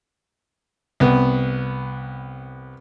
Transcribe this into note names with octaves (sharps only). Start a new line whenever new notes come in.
C2 B3